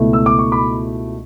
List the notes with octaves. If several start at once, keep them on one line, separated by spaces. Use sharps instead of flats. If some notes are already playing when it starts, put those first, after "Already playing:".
Already playing: C#2 B2 A3 E4
E6
D6
C#6
B5 D6